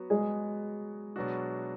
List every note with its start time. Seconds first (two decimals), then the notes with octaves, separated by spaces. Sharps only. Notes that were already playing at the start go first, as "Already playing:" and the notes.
Already playing: F#3 B3 F#4
0.10 G#3 G#4
1.16 B2 F#3 B3 D4 F#4